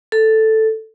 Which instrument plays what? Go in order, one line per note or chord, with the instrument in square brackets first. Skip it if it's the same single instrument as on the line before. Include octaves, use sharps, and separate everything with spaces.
[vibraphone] A4